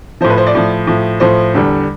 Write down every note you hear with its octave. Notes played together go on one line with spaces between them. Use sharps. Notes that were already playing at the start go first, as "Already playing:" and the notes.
A2 F3 C5
B4
C5
D5
A2 F3
A2 F3
A2 F3 C5
E2 D3 G3